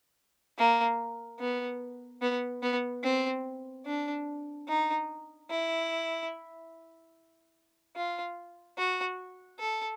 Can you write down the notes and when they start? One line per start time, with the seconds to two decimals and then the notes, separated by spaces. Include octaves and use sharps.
0.58 A#3
1.40 B3
2.22 B3
2.62 B3
3.03 C4
3.86 D4
4.68 D#4
5.50 E4
7.96 F4
8.78 F#4
9.59 A4